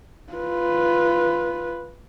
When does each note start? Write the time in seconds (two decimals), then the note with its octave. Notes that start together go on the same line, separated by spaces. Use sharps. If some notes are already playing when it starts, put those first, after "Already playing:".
0.33 F4 B4